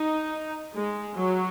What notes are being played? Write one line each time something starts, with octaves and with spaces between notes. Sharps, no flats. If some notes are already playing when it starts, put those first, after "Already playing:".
Already playing: D#4
G#3
F#3